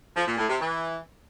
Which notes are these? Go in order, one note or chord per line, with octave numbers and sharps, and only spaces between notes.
F3
A#2
A2
C3
E3